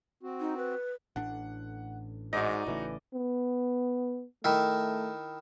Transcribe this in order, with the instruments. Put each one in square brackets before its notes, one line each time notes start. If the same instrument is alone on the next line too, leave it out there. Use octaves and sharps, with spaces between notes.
[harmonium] C4 F#4
[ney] D#4
B4
[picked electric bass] A1 A2 D4 [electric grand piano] F#5
[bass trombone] G#2 [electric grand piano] D#4 F#4 [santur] D5 D#5
[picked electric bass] A1 C#3 A3 [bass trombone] E3
[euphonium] B3
[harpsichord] D#3 E4 [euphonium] A3